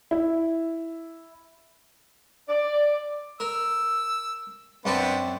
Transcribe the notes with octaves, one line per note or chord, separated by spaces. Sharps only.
E4
D5
A#4 E6
F#2 B3 C4 D4 C5 A5